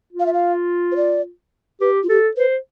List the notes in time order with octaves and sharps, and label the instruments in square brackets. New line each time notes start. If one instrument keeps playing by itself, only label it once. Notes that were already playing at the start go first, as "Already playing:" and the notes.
[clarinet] F4
[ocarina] F5
E5
F5
C5
D5
[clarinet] G4 [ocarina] B4
[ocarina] F4
[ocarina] G4 [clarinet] A4
[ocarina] B4 [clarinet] C5